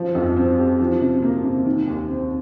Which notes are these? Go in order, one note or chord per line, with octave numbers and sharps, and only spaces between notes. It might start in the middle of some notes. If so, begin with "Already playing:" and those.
Already playing: F3 F4
F2
C4
G4
F3
C3
A#3
C3
D#3
D#2
C4